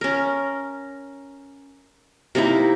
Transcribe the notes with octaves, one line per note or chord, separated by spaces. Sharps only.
C#4 A#4
C3 A#3 D#4 E4